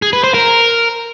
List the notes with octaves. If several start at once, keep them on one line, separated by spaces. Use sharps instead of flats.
G#4
B4
C5
A#4